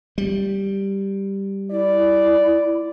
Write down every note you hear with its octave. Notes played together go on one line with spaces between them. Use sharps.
G3
E4 D5